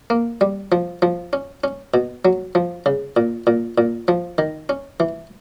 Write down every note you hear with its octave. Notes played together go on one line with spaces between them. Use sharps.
A#3
G3
F3
F3
C#4
C#4
B2
F#3
F3
C#3
A#2
A#2
A#2
F3
D#3
C#4
E3